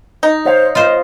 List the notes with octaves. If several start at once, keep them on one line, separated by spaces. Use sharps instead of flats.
D#4
C5 C#5 F5
F4 C5 D#5